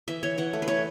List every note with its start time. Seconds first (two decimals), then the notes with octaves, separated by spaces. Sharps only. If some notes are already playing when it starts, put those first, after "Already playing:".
0.08 E3 E5
0.23 E3 C#5
0.38 E3 F#5
0.53 A3
0.62 B4
0.68 A3 C#5